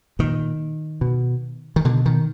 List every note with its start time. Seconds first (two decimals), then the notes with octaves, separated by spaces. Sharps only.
0.19 A#2 D#3
1.01 B2
1.76 D#3
1.85 B2 D3
2.06 D#3